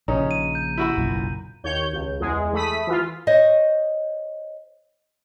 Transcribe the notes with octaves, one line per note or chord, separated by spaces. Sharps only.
A#1 C#3 C#4 D#4 A#5
D#7
G6
E4 F#4 B5
F#1 B1 A#2
D#2 C#5 G6
C#2
E2 G#3 G#4
A3 B5 D#6 B6
E3 F4
C5 C#5 D#5